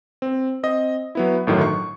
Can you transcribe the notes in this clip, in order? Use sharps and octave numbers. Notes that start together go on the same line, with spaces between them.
C4
C4 D#5
F#3 B3 E4
G1 A2 D#3 F#3
C#6